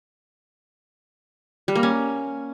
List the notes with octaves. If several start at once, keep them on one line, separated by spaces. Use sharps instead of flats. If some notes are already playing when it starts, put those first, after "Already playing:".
G3
A#3
C#4